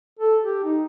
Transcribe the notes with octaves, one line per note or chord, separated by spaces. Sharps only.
A4
G4
D#4